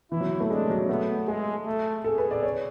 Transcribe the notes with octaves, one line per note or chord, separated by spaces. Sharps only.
E3 E4
F#3
A3
G#3 D4
F#3
A3 B3
G#3 G#4
A3
G#4 A4
B4
D5
C#5